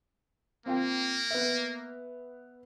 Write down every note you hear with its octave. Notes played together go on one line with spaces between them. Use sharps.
A#3 C4 F4 G5
B3 E5